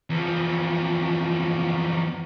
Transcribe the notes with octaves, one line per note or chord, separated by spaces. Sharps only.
E2 F3